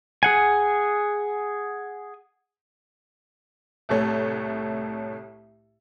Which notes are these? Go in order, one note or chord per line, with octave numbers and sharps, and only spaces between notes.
G#4 F#5 G#5
C2 A2 A3 C#5